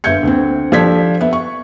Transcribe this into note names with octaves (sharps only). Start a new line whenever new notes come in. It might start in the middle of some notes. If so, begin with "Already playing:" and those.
G1 E5 G6 G#6 C#7
D2 C4
F3 G3 D4 A4 G#6 B6
B3 E5
C#6